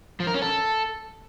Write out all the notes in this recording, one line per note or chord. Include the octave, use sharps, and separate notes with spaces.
F3
A#4
C#4
A4